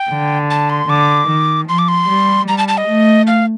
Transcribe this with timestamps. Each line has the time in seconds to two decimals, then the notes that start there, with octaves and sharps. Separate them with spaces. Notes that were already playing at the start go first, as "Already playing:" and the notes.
Already playing: G5
0.10 D3
0.50 A5
0.70 C6
0.90 D3 D6
1.30 D#3
1.69 F3 C6
1.79 D6
1.88 C6
2.08 G3
2.48 G3 A#5
2.58 A5
2.68 A5
2.78 D#5
2.87 A3
3.27 F5